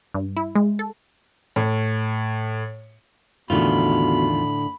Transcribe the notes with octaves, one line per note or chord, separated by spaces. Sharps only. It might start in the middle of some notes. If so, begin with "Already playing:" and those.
G2
E4
G#3
A4
A2
E2 A2 D3 D#3 B3 F4 F#4 B5